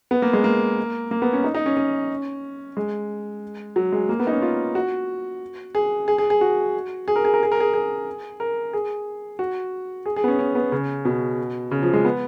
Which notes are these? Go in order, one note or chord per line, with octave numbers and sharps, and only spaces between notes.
B3
A#3
G#3
A#3
A#3
B3
C#4
D#4
D#4
C#4
C#4
G#3
F#3
G#3
A#3
B3
D#4
C#4
F4
F#4
G#4
G#4
G#4
G#4
F#4
G#4
A#4
G#4
A#4
G#4
A#4
G#4
G#4
A#4
G#4
F#4
G#4
G#4
B3
C#4
C#4
B3
C#3
B2
C#3
F3
G#3
B3